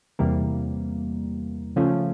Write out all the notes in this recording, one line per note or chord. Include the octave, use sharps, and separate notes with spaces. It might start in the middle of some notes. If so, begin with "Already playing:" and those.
E2 C3 E3 G3 A#3
C#3 F3 A3 C#4 F4